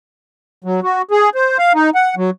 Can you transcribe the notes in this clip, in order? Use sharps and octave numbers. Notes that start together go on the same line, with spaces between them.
F#3
F#4
G#4
C5
F5
D#4
F#5
F#3